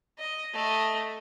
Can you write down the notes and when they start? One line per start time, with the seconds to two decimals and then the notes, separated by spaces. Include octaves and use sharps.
0.19 D#5
0.54 A3 D#5